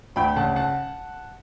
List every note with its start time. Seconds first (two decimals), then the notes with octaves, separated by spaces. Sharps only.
0.16 D2 G5 B5
0.36 C#3 F#5 A5
0.56 F#5 A5